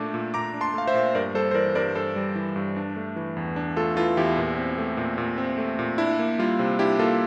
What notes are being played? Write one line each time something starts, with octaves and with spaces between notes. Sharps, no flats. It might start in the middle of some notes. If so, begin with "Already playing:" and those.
Already playing: A#2 A3 D4 D6
A#2
A#2 A#5 D6
D4
A5 C6
A3 F5
C5 E5
A#2
G2 A#4 D5
G3 A4 C5
C5
E3 A#4 D5
G2 A#4 D5
G2 A4 C5
G3
E3
G2
D4
A3
E3
E2
D4
A3 F4 A4
E3 F4 A4
E2 E4 G4
A#2
C4
A3
A#2
A#2
C4
A3
A#2
D4 E4
A#3
G3 F4
C3
D4 E4 G4
A#3 F4 A4